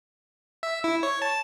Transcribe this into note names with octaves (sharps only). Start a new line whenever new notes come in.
E5
E4
C#5
A5